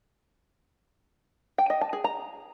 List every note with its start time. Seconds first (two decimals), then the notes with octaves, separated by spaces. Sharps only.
1.58 G5
1.70 D#5
1.81 A5
1.93 G#4
2.04 A#5